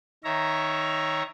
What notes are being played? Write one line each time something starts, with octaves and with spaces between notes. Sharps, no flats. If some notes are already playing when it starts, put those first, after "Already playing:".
D#3 C#5 E5 A#5